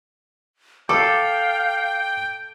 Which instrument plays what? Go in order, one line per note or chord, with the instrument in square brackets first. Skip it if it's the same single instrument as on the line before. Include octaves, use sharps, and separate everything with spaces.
[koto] A4 [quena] F5 [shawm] G5 [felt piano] D6